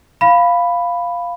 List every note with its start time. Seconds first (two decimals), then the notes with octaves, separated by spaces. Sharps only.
0.21 F5 B5